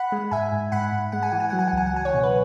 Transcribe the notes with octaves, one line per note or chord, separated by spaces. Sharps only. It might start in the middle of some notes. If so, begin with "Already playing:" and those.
Already playing: F#5 B5
G#3
G#2 E5 G#5
G#2
G#2 F#5 B5
G#2
G#3 F#5
G#5
E3 F#5
G#5
F#3 F#5
G#5
F#5
C#2 G#5
F#5
F#3 G#5
C#5 F#5
B2
B4